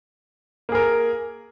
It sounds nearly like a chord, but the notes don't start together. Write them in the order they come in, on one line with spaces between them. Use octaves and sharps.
A#3 G#4 A#4